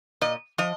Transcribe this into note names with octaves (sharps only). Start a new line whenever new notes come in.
A#2 D#5
F3 D#5